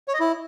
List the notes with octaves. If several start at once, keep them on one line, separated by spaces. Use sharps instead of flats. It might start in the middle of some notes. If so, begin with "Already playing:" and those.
C#5
D#5
E4